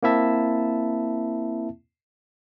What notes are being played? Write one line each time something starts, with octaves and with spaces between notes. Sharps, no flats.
A#3 C4 E4 E5 A5